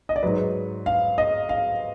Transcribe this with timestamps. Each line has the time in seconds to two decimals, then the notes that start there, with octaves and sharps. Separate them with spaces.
0.09 D#5
0.16 D5
0.23 G#2 F#3 B4
0.86 F5
1.18 D#5
1.49 F5